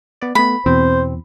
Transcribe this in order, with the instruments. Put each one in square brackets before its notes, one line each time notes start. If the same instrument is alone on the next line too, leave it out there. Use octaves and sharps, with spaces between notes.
[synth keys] B3 D5
[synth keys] A3 B3 [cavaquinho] B5
[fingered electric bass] E2 [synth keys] B2 C4 [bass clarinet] C5